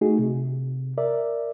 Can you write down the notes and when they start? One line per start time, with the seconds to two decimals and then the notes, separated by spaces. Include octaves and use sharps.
0.01 A3 D#4 F#4 G#4
0.19 C3
0.98 A#4 D5 E5